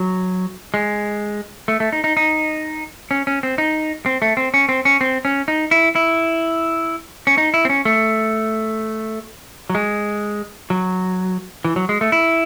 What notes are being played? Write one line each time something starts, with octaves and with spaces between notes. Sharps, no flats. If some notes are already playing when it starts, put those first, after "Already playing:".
Already playing: F#3
G#3
A3
A3
D#4
D#4
D#4
C#4
C#4
C4
D#4
C4
A3
C4
C#4
C4
C#4
C4
C#4
D#4
E4
E4
C#4
D#4
E4
C4
C#4
A3
F#3
G#3
F#3
E3
F#3
G#3
A3
E4